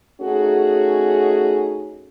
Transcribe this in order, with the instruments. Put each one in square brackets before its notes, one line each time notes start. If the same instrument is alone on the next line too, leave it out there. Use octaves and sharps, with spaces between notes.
[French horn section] A3 C#4 D#4 F#4 G#4